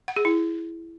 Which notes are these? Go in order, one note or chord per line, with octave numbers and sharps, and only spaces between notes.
F#5
G#4
E4